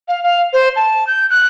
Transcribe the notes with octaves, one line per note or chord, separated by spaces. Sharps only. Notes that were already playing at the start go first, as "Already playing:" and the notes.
F5
F5
C5
A5
G6
F#6